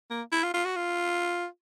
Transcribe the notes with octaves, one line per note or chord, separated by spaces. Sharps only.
A#3
E4
F4
F4
F#4
F4